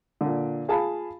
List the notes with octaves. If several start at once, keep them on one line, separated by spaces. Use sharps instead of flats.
A#2 D3
F4 G#4 F5 A5 B5